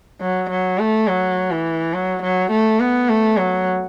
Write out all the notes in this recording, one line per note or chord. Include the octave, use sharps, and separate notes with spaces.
F#3
F#3
A3
F#3
E3
F#3
F#3
A3
B3
A3
F#3